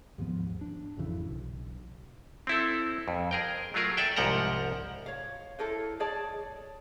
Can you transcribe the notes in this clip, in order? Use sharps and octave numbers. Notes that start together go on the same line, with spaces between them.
D#2 G#2 F3 B3
D4
G#1 F2 C#3 E3
B1
C4 E4 A4
F2
G#4 A#4 G5
F#3 A3 F4 G#4 A#4
A4 D5 E5 G5
C2 G#2 F3 F#5 G5 A#5
C#5 F5
E4 A4 A#4 C5
G#4 C#5 D5 A5